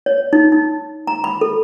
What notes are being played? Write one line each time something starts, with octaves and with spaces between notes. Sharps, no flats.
C#5
D#4
D#4
A#5
B5
A4